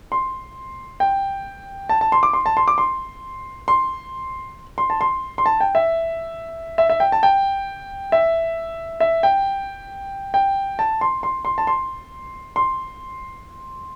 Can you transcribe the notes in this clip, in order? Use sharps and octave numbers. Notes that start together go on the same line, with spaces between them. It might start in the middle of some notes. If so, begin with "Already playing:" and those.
C6
G5
A5
A5
C6
D6
C6
A5
C6
D6
C6
C6
C6
A5
C6
C6
A5
G5
E5
E5
E5
G5
A5
G5
E5
E5
G5
G5
A5
C6
C6
C6
A5
C6
C6